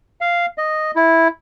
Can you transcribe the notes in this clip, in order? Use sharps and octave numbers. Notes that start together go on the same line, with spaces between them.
F5
D#5
E4